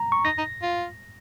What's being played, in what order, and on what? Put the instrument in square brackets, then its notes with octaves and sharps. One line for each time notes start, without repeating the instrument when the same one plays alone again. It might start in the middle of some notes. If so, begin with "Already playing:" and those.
Already playing: [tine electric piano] A#5
C#6
[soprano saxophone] D#4 [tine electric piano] A#6
[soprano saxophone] D#4
F4